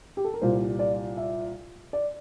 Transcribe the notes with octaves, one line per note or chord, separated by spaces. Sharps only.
G4
A4
A#4
C2 A#2 G3 C5
D5
E5
D5